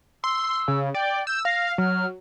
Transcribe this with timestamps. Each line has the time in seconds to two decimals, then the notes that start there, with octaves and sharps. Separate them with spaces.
0.24 C6 E6
0.68 C#3
0.95 D5 G5
1.27 E6 G6
1.45 F5 A#6
1.78 F#3 F6